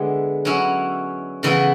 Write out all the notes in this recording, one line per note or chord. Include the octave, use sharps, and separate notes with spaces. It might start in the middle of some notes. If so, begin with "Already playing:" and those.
Already playing: D3 G#3 B3 E4
F#3 C#4 E4
C#3 E3 B3 E4